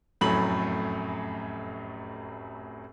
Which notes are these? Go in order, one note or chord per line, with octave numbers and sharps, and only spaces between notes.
F1 F#2 A2 F#3 B5 F#7